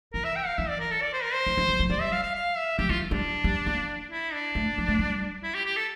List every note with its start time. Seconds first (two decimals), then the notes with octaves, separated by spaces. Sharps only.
0.13 E3 A#4
0.24 E5
0.36 G5
0.47 F5
0.57 E3 E5
0.69 D5
0.80 A#4
0.91 A4
1.02 D5
1.13 C5
1.23 A#4
1.34 C5
1.46 E3
1.57 E3
1.69 G3
1.79 F3
1.90 G3 D5
2.01 E5
2.12 F5
2.23 F5
2.35 F5
2.56 E5
2.78 F3 G4
2.89 E3 F4
3.11 G3 D4
3.44 G3
3.66 A#3
4.11 E4
4.33 D4
4.55 A3
4.78 F3
4.88 A3
4.99 G3
5.43 E4
5.55 G4
5.66 G4
5.76 A4